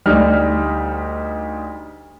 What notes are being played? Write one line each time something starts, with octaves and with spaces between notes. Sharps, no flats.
D2 G3 D#4 F6